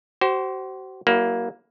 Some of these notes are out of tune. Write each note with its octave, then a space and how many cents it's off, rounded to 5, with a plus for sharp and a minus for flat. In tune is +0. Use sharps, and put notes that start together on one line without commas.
F#4 +40 C5 +0
F#3 +35 A#3 +10 E4 +0